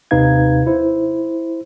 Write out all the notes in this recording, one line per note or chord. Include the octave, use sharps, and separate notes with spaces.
D#2 C3 D#4 B4 F5 G#6
E4 C5